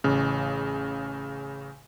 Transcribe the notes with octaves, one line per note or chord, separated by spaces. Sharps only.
A1 C#3